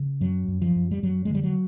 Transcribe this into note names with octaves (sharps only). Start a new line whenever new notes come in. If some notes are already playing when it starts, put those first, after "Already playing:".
Already playing: C#3
F#2 F#3
F#2
F3
F#2
G3
F#2 F#3
G#3
D3 G3
F#3